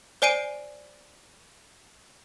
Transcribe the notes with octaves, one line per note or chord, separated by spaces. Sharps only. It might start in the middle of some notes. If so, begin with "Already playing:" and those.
C5 D5 G#5 C7 D7 D#7